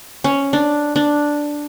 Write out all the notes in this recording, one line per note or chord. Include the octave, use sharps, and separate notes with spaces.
C#4
D4
D4